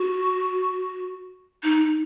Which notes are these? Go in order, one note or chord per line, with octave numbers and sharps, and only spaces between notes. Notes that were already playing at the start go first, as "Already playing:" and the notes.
Already playing: F#4
D#4